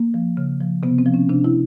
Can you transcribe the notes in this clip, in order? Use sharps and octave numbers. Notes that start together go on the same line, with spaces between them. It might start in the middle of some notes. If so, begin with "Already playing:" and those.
Already playing: A#3
F3
C#3
F3
C3 B3
C4
F3
C#4
C3 D4
E4